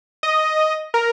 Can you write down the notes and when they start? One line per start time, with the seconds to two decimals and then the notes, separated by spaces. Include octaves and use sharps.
0.23 D#5
0.94 A#4